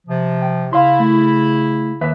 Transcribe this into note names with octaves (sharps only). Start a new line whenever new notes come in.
C3 F3
G5
C#3 E4 F5 C6
A3
D#2 B4 E5